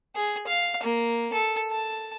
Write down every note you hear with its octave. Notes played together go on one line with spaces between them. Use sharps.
G#4
F5
A#3
A4
A5